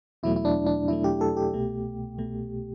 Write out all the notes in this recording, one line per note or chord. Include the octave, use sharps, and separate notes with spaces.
E2 B2 F#3 A3 E4
E4
D4
D4
E2 B2 F#3 A3 E4
G4
A4
G4
C2 B2 A3
C2 B2 A3